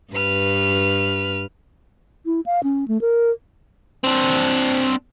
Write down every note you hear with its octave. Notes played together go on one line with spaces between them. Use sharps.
G2 B4 F6
E4
F5
C#4
A3
A#4
C4 D4